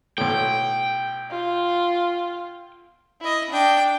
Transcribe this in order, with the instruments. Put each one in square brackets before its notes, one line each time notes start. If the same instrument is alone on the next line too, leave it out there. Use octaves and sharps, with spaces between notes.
[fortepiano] B1 A2 [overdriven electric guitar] G5
[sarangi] F4
[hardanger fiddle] E4 D#5
D4 G5